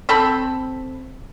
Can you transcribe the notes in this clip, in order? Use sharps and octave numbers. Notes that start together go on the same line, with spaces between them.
C4 A4 B5